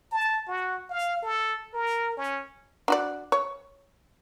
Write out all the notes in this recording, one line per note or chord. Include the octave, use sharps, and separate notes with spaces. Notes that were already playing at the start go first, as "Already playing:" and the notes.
A5
F#4
F5
A4
A#4
C#4
D4 F#4 D5
C#5